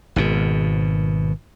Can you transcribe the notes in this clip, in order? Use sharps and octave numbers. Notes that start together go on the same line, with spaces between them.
G#1 B2